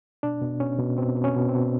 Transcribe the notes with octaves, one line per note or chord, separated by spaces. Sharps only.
B2 D4
B2
B2 C#4
B2
B2 C4
B2
C#4
B2
C4
B2